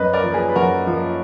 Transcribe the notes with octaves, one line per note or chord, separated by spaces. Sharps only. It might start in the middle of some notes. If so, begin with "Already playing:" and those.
Already playing: F#2 B4 D#5
A#4 D5
F3 A#3
G#4 B4
B4
F#2 F#4 A#4
F3 A#3